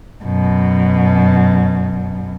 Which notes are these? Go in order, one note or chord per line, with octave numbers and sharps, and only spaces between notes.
F#2 B2